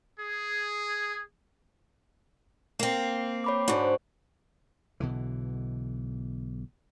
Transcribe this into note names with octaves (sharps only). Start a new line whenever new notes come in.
G#4
A#3 C4 F5
C#5 B5 D6
G#2 D3 F#4 C5 D5
B1 B2 D3 E3